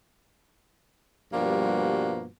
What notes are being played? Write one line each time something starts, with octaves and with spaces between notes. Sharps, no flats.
G2 B2 F3 G3 A#3 F#4